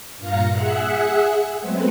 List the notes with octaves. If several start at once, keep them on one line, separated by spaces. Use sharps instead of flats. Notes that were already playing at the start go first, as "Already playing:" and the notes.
G2 A#2 F4 F5 A#5 C#7
G#4 E5 F#5 F#6
F#3 G#3 A3 B3 C4